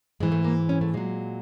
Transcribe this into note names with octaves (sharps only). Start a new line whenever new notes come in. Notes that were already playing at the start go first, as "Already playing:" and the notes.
G#2 E3 G#3
A3
A#3
C#4
A3
A#2 F#3 G#3